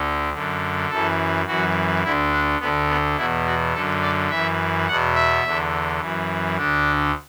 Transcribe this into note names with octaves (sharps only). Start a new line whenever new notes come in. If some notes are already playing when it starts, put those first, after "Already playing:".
Already playing: D2 D3
F#2 D3
F#2 E3 A4
F#2 E3 F#4
D2 D3 E4
D4
D2 D3 B3
B3
E2 B2 E4
F#4
F#2 D3 A4
D5
F#2 E3 E5
E2 B2 F#5
E5
E2 D3
F#2 E3
D2 D3 D4